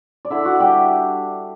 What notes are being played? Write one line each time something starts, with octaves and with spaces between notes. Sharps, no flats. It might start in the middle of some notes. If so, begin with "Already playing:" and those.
D5
D3 E4 E5
F#4 F#5
G3 D4 G4 G5